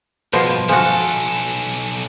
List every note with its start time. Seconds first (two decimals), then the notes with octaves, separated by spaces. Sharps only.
0.33 G2 B2 F3 C5
0.69 B1 F3 F#4 A4 G#5